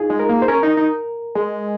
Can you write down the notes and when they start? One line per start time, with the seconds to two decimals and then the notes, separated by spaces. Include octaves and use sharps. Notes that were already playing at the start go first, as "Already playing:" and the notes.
Already playing: D#4 F4 G#4
0.10 G#3
0.19 A#4
0.29 A#3
0.42 C5
0.48 C#4 A#4
0.63 D#4
0.77 D#4
1.35 G#3